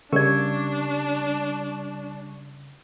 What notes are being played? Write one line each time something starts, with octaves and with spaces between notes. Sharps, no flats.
C#3 G3 D4 A#4 D5 C#6